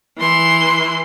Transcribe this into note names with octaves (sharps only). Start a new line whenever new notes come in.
E3 C6